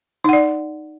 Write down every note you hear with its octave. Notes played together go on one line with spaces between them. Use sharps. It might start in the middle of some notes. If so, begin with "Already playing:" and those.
D#4 D5 F#5